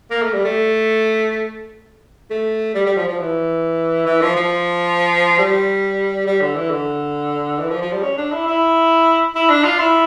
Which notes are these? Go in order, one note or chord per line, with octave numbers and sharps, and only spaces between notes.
A#3
A3
G3
A3
A3
G3
G3
F3
F3
E3
E3
F3
F3
G3
G3
D3
E3
D3
E3
F3
F3
G3
C#4
D4
E4
E4
E4
D4
F4
E4